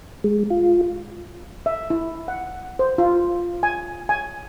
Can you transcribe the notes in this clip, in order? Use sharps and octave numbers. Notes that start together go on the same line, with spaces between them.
G#3
F4
E5
E4
F#5
C5
F4
G#5
G#5